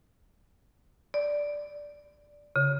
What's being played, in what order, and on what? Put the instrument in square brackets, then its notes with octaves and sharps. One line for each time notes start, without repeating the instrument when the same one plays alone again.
[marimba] D5
C#3